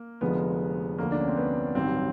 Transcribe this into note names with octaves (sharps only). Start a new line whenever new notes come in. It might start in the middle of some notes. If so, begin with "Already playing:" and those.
Already playing: A#3
F1 F2 D3 F3 G#3 B3
D2 D3 F3 A#3
D4
C#4
C4
B3
A1 G2 D#3 F#3 C4